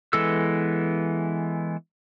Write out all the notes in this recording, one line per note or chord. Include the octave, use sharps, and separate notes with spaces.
E3 G#3 B3 A4 E6